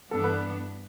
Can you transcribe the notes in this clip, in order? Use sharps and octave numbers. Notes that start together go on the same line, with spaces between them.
G2 E3 B3 D4 A4
B4